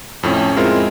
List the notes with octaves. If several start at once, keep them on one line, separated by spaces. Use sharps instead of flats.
F2 A2 C#4
G#3 C4 E4 F4 A#4